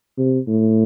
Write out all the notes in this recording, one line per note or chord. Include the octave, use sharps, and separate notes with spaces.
C3
A2